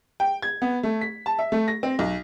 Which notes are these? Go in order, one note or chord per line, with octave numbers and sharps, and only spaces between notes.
G5
G#6
B3
A3
B6
A5
E5
A3
A#6
C4
B1